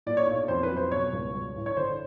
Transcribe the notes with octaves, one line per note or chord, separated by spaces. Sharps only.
A#2 D5
C#5
B1 C#5
F2 C5
B4
F#3
C5
B2 C#5
C#2
G2
A1
C#5
D3 C5